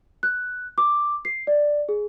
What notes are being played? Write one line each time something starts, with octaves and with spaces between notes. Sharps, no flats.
F#6
D6
C7
D5
G#4